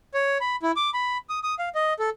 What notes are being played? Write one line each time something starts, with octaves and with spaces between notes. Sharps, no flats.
C#5
B5
E4
D6
B5
D#6
D#6
F5
D#5
A4